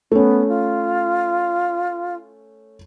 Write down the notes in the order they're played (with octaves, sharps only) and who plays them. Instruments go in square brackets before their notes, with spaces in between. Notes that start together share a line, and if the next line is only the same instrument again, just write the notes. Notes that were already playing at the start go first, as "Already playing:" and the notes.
[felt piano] A3 C#4 [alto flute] B3
[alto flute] F4